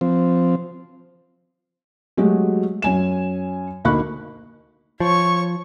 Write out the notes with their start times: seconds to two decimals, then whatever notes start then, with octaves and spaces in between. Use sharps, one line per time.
0.01 F3 C4
2.17 F#3 G#3 A3 F#4 G4
2.82 F#2 G#5 E7
3.85 D2 A#3 D#4 B5 C#6 F#6
5.00 F3 C#5 C#6